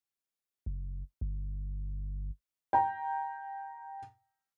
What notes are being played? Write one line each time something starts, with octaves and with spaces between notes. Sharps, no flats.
F#1
G1
G5 A#5